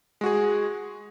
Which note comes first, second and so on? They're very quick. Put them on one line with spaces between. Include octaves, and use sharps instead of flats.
G#3 F#4 G#4